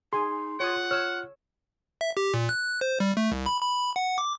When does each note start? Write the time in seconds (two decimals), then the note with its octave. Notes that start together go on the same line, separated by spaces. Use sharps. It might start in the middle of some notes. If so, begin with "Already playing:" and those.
0.13 D#4 G#4 G#5 C6
0.60 F4 C#5 F#5 D#6
0.91 C#5 E6 F6
2.01 E5
2.17 G4
2.34 A#2
2.49 F#6
2.81 C5
3.00 G3
3.17 A3
3.32 C2
3.46 B5
3.62 B5
3.96 F#5
4.18 D6